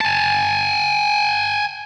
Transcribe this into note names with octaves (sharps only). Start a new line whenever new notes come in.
G#5 A5